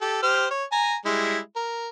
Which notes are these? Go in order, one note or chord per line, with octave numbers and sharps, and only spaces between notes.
G4 A4
G4 C5 F6
C#5
G#5 A#5
G3 G#3 E4
A#4